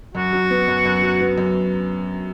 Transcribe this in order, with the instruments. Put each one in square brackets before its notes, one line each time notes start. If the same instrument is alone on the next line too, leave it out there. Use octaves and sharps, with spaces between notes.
[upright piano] F#2 [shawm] F#4
[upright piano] F#3
B3
F#2
F#2
F#3
B3
F#2